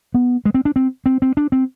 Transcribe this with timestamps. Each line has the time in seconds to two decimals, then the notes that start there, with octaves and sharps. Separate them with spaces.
0.14 B3
0.45 G#3
0.54 C4
0.65 D4
0.76 C4
1.06 C4
1.22 C4
1.37 D4
1.52 C4